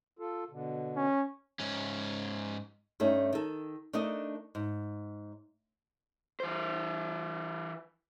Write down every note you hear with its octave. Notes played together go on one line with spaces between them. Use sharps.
F4 A4
B2 D3
C#4
G#2 C#4
G2 A3 C#4 D#4
D#3 A4
A3 D4 D#4 A#4 D#5
G#2
E3 C5